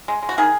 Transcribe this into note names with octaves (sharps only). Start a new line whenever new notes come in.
G#3
G#3
F#4
D#3 G#4